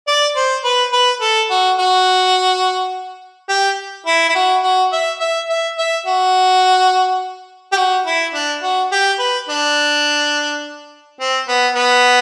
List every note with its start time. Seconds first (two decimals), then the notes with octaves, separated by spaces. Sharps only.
0.07 D5
0.36 C5
0.64 B4
0.93 B4
1.21 A4
1.50 F#4
1.79 F#4
3.49 G4
4.06 E4
4.29 E4
4.35 F#4
4.63 F#4
4.93 E5
5.20 E5
5.49 E5
5.78 E5
6.06 F#4
7.72 G4
7.77 F#4
8.06 E4
8.34 D4
8.62 F#4
8.92 G4
9.19 B4
9.49 D4
11.20 C4
11.48 B3
11.76 B3